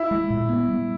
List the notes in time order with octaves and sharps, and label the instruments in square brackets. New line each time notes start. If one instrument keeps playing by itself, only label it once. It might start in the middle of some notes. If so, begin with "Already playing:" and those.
Already playing: [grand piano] E4
[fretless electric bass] G#3
A#2
B3
G3